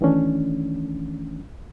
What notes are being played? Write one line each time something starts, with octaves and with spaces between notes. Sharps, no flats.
D#3 E3 A3 C#4 D4